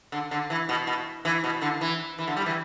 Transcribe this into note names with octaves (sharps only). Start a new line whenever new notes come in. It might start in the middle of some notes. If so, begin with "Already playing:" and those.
D3
D3
E3
B2
B2
E3
B2
D3
E3
E3
D3
G3
E3